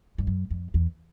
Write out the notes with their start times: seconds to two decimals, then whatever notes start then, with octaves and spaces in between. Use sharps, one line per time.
0.18 G2
0.27 F#2
0.50 F2
0.74 E2